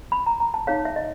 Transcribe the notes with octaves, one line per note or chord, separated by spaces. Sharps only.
B5
A#5
A#5
A5
D#4 G#4 C#5 F5
E5
D#5